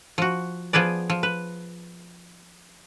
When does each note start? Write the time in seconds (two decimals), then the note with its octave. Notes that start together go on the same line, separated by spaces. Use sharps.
0.18 F3 F#4
0.73 F3 B3 G#4 B4 D5
1.10 F3
1.23 B4